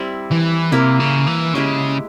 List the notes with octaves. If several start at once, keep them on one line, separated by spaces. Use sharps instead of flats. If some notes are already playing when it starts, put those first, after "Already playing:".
Already playing: G3 C4 E4
E3
C3 A#3 E4 A#4
C#3
E3
C#3 G#3 E4 G4